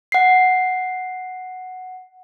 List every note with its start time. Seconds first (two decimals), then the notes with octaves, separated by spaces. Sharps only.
0.12 F#5 C7